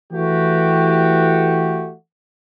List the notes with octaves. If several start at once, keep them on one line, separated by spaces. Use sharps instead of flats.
E3 A3 F#4 G4